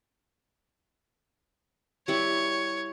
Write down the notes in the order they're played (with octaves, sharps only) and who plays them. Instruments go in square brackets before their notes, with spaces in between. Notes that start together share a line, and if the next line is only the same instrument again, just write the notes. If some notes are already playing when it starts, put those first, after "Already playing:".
[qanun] G3 E4 [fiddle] C#5